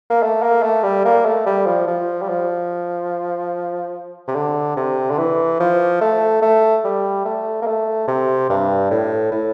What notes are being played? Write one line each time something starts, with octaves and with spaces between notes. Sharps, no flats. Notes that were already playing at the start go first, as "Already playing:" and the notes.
A#3
A3
A#3
A3
G3
A#3
A3
G3
F3
F3
G3
F3
C3
D3
C3
D3
E3
F3
A3
A3
G3
A3
A#3
A3
C3
G2
A2
A2